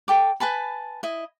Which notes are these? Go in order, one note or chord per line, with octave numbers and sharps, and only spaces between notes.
A4 G5 D6
B4 G#5 A5 B5
E4 D#5